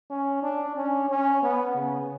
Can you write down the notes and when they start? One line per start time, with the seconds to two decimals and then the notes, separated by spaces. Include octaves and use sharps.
0.10 C#4
0.43 D4
0.76 C#4
1.09 C#4
1.43 B3
1.75 C#3